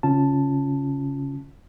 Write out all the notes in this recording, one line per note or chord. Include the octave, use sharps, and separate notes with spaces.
C#3 C#4 F4 A5